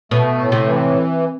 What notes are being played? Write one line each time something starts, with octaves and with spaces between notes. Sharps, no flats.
B2 A3
A2
C3
E3